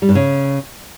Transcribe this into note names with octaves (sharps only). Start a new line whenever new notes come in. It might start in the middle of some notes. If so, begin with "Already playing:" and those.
G3
G2
C#3